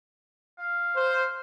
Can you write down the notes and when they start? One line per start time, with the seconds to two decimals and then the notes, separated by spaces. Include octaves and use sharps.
0.59 F5
0.96 C5